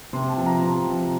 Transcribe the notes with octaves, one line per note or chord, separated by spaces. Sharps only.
C3 C6
A5
F3
A#5
C3
F3